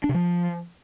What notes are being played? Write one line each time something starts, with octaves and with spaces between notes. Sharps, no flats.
D4
C3
F3